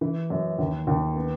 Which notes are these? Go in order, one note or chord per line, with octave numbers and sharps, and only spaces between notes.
E3
F#2
D#2
D#2
B3